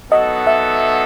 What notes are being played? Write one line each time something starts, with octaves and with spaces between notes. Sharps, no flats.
F#3 B3 D#4 F#4 A4 D#5
E5